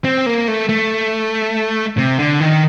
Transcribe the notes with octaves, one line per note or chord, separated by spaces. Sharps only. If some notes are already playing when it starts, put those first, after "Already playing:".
C4
A#3
A3
A3
C3
D3
D#3